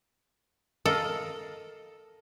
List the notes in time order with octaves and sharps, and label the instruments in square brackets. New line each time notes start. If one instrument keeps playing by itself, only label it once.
[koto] A4 [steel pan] A#4 D#5 F5